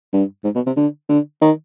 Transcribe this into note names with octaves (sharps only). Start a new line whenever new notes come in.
G2
G#2
B2
C3
D3
D3
D#3